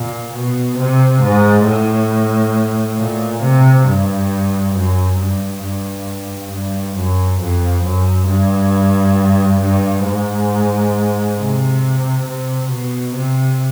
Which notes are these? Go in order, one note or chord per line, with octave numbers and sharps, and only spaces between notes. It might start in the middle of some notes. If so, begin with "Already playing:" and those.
Already playing: A#2
B2
C3
G#2
A2
A#2
C3
G2
F#2
G2
G2
G2
F#2
F2
F#2
G2
G2
G#2
C3
C3
B2
C3